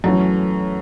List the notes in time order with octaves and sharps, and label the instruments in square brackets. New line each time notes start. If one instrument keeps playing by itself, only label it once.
[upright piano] F#2 [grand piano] E3 A3 C#4 F#4 A4